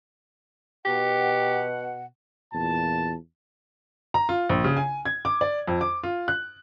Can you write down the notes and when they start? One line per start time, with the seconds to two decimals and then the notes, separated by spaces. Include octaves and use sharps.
0.85 B2 G4 F#5
2.53 E2 A#2 F4 A5
4.14 A#5
4.29 F4
4.49 A#1
4.64 C#3
4.77 G#5
5.05 G#6
5.25 D6
5.41 D5
5.68 F2
5.81 D6
6.03 F4
6.28 F#6